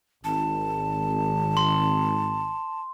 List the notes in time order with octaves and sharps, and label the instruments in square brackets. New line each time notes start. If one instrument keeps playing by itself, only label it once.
[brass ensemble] G#1 [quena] A5
[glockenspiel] C6